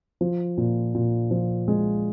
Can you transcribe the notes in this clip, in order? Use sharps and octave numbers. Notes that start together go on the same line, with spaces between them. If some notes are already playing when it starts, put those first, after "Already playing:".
F3
A#2
A#2
F3
G#3